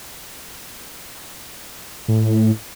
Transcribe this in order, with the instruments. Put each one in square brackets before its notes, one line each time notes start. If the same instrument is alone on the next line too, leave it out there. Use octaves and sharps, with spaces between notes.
[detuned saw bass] A2